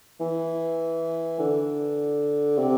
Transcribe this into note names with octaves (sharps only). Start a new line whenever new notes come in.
E3
D3
C3